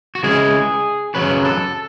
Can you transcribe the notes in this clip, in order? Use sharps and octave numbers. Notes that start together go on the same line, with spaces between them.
F#4
C#3 G#3 C#4 E4 G#4
F#2 C#3 F#3 C#4 B4
A4